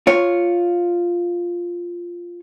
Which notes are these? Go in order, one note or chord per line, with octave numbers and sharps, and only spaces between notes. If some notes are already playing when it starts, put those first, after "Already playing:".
F4 C#5